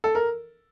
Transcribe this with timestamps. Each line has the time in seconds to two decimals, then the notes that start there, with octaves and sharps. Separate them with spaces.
0.04 A4
0.15 A#4